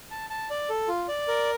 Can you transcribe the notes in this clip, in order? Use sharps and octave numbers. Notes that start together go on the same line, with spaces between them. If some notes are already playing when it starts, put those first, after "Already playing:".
A5
A5
D5
A4
F4
D5
A#4